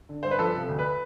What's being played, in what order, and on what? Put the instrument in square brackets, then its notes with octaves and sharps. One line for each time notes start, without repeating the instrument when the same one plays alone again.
[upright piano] D3
G2 C5
B4
F3 A4
C3
D2
B4